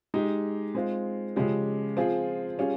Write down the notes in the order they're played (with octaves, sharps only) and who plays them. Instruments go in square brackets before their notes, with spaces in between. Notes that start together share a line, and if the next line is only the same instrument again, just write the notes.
[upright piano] G#3 D#4 G4
G#3 C4 F4
C#3 F3 G#3 C#4 G4
F3 C4 F4 G#4
G3 C#4 F4 G#4